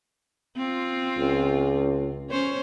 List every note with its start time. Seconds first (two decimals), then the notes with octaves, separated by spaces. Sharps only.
0.57 C4 F4
1.18 C#2
2.30 C#4 C5 C#5